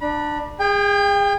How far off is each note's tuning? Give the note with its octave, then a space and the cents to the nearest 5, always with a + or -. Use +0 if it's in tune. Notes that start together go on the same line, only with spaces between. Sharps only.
D4 +20 B5 -35
G#4 -30 G5 +30